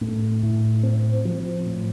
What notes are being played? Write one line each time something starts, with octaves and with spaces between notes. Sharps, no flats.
A2
A2
C4
F3
A2